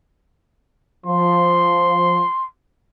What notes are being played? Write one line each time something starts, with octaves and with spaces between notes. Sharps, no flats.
F3 C6